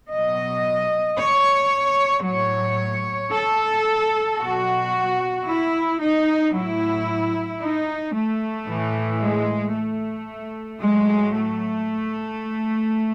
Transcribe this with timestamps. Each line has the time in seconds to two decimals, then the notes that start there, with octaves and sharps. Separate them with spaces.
0.11 B2 F#3 D#5
1.18 C#5
2.25 A2 F#3 C#5
3.32 A4
4.39 B2 F#3 F#4
5.46 E4
6.00 D#4
6.53 A2 F#3 E4
7.61 D#4
8.14 A3
8.68 A2 E3
9.21 G#3
9.74 A3
10.81 A2 F#3 G#3
11.35 A3